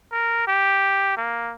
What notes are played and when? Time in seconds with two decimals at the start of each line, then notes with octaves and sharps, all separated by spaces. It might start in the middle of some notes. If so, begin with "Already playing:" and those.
0.12 A#4
0.47 G4
1.17 A#3